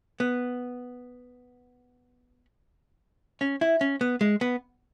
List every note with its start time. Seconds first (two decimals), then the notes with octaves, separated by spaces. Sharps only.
0.20 B3
3.41 C#4
3.61 E4
3.81 C#4
4.01 B3
4.21 G#3
4.41 B3